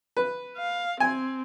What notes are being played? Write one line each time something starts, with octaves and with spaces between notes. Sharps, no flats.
B4
F5
C4 G#5